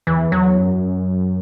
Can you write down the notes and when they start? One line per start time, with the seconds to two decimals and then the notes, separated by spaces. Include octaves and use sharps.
0.07 E2 E3
0.31 E2 F#3
0.58 F#2